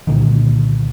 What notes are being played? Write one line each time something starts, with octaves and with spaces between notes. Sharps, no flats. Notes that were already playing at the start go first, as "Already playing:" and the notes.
C2 A#2 D3 D#3